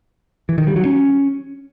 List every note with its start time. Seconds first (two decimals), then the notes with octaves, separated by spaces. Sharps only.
0.49 E3
0.58 D#3
0.67 G3
0.76 F#3
0.85 C#4